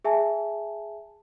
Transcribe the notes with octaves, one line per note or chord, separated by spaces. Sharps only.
G#4 E5 G#5 A5